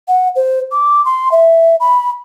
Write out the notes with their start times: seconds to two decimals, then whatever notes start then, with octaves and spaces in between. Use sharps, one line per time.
0.08 F#5
0.36 C5
0.72 D6
1.05 C6
1.32 E5
1.80 B5